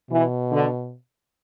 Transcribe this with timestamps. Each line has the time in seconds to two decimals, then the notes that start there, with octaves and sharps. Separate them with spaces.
0.11 B2 E3
0.51 D3